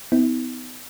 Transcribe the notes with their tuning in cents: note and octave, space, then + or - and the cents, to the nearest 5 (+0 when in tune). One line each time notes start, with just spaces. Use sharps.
B3 +35 D#4 +45